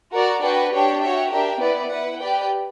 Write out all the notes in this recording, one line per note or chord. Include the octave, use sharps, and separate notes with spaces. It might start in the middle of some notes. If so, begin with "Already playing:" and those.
F#4 A#4 D5
D4 F#4 B4 D5 G5
D4 G4 C#5 G5
F#4 C#5 E5 G5
D4 G4 A#4 E5 G5
B3 E4 B4 D5
E4 B4 F#5
G4 B4 D5 G5